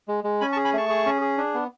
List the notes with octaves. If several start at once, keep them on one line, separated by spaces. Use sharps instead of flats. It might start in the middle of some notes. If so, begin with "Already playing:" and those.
G#3
G#3
C#4 G#5 B5
A5 C#6
G#4
G#5 B5
A3 A5 C#6
G#4
C#4
G#4
D4
B3